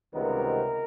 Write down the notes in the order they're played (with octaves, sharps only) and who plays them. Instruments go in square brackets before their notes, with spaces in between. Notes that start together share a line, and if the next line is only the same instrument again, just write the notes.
[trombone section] C#2 C3 D#3 G3 B3 A#4